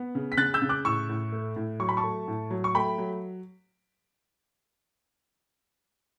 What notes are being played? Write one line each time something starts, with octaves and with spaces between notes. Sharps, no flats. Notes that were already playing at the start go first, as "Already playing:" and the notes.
Already playing: B3
C#3
B6
C#3 F#6 A6
E6 G6
C#3
D6 F#6
A2 C#6 E6
A2
A3
A2
F#3 C#6
B5
A5 C#6
A3
A2
F#3
C#6
A3 G5 B5
F#3